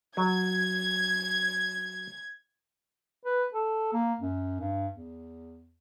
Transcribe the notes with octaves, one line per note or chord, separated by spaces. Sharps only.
F#3 G#6
B4
A4
A#3
F#2
G2
E2